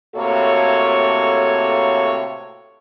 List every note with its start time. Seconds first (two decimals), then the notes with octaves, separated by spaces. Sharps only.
0.16 A2 C3 A#3 F#4 A4 C#5